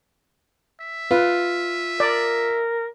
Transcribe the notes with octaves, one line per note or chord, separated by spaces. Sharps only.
E5
F4 B4
A#4 D5